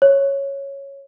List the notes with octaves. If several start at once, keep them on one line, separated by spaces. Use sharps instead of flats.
C#5